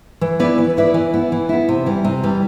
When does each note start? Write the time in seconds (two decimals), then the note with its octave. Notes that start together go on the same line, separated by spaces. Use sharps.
0.21 E3
0.40 B3 E4 B4 D5
0.58 E3
0.77 B3 E4 B4 D5
0.94 E3
1.14 B3 E4
1.32 E3
1.49 B3 E4
1.69 C3
1.86 E3 G3
2.04 C3
2.24 E3 G3